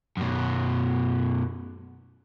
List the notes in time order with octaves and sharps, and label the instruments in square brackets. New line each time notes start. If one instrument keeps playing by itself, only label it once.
[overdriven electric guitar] F#2 B2